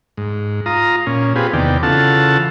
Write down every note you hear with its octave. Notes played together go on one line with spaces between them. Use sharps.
G#2
F4 A#5 D#6
A#2 C#4
C4 F4 G4 G#4 B4
E2 C3 D#3 B3 D5 G5
C#3 E3 F4 A4 F#5 A5